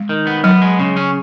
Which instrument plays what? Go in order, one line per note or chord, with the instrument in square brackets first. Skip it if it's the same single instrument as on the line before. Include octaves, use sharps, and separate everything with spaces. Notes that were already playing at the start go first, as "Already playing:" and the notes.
Already playing: [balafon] G#3
[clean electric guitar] D#3
B3
[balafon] F#3 [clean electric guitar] B3
[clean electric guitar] G#3
C#3
C#4